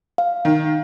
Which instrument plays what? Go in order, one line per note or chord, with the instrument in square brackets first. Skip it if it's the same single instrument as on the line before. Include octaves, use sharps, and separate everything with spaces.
[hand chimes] F5
[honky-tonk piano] D#3